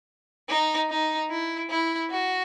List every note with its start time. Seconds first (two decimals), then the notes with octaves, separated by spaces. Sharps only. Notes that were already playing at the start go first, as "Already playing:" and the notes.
0.49 D#4
0.89 D#4
1.30 E4
1.70 E4
2.11 F#4